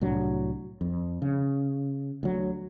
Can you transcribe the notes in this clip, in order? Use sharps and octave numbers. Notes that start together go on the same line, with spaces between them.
C2 A2 F#3 D4
F2
C#3
D2 F#3